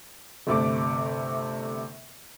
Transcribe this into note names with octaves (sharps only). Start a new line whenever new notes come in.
G1 C3 A3 D6